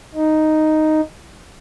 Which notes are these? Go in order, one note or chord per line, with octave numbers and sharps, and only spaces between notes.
D#4